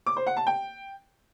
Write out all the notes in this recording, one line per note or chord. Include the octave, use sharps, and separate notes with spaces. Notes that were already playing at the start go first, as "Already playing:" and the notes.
D6
C5
F#5
A5
G5